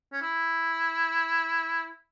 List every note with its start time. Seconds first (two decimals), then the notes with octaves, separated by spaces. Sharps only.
0.12 C#4
0.22 E4